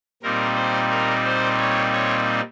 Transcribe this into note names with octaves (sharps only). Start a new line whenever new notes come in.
A#2 G3 C4 D#4 A#4
C5
A#4
C5
C#5
C#5